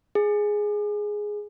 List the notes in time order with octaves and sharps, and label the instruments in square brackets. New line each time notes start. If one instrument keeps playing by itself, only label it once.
[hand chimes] G#4